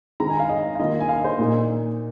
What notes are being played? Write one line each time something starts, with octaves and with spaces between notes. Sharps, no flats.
D#3 G#3 C4 A#5
G#5
F5
D#5
F5
D#3 A#3 F4 D#5
G#5
F5
D#5
C5
A#2 A#3 D#4